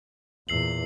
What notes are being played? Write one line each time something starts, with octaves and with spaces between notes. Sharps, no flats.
E2 A#2 E6 C7 F#7